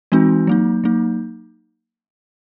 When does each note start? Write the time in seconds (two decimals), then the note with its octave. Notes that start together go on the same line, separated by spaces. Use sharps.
0.12 E3 G#3 C4 D#4 F#4
0.47 F#3 A#3 D#4
0.84 F#3 A#3 D#4